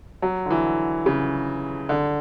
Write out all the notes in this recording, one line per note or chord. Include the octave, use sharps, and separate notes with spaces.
F#3
D3
E3
C#3
D3